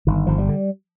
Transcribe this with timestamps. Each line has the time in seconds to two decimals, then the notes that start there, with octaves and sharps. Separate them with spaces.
0.07 G1 D#3
0.27 G1 F3
0.38 G3
0.49 D3